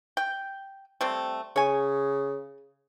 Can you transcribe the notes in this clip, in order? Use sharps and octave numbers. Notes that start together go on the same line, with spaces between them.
G5
G3 A3 C4
C#3 C#5 G#5